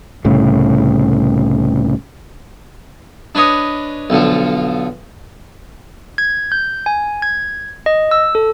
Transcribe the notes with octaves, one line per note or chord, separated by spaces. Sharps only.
C2 A2 C#3
D4 B4 C#5 D#5
B1 D3 F3
G#6
G6
G#5
G#6
D#5
E6
A4